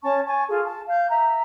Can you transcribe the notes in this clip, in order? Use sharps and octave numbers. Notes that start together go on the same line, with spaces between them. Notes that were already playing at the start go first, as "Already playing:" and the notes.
C#4 A5 C#6
G#5 A5 C#6
F4 G#4 A4
A5
F5 G6
E5 A#5